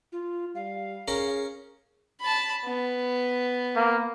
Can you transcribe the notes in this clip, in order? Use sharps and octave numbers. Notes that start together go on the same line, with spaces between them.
F4
G3 F5
C#4 G#4 A#4
A5 B5
B3
A#3